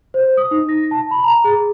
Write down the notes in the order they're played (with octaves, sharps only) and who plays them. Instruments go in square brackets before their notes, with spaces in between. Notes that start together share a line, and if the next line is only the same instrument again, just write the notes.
[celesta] C5
D#6
D#4
A#6
A5
B5
A#5
G#4